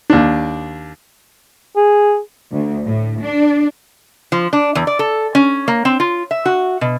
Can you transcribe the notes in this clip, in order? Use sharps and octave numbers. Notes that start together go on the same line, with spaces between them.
D#2 D4
G#4
D2
A2
D4
F3
D4
E2
D5
A4
C#4
A#3
C4
F4
E5
F#4
B2